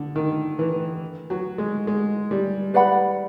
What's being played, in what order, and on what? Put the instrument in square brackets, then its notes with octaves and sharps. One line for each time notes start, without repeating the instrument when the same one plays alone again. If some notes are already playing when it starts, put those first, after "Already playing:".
Already playing: [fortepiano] D3
D#3
E3
F#3
G#3
G#3
G3
[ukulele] B4 D5 F#5 B5